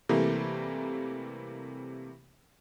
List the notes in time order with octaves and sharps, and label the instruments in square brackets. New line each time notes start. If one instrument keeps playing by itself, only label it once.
[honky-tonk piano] C3 E3 G3 A3 A#3